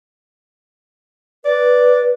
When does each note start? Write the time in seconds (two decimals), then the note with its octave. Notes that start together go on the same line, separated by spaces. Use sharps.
1.45 B4 D5